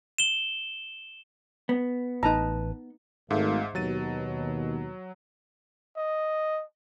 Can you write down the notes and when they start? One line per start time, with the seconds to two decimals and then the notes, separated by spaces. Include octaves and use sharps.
0.18 E7 G7
1.69 B3
2.23 A1 A2 D#4 B4 A5 A#5
3.31 G#1 G#2 A3 E5 F5
3.75 D#2 B2 F#3 A6 D#7
5.97 D#5